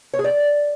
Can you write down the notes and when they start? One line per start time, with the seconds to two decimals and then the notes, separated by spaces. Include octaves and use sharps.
0.14 C#5
0.19 G#4
0.24 D5